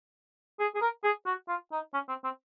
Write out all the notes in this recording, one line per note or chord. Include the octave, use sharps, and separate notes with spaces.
G#4
G#4
A#4
G#4
F#4
F4
D#4
C#4
C4
C4